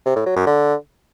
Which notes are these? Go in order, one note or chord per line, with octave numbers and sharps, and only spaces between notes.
C3
A2
F#3
F#2
D3